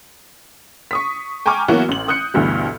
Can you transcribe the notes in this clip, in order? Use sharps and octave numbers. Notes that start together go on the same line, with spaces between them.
C#6 D#6 B6
G5 G#5 A#5 C#6 D6 F6
E3 F#3 A#3 B3 E4 F#4
A1 F#7
D#6 F#6 G6 C#7
D2 G2 B2 E3